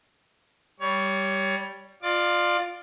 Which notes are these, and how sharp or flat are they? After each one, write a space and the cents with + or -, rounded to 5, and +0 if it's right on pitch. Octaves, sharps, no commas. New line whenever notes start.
G3 +0 C#5 +20
F4 +5 D5 +35 D6 +0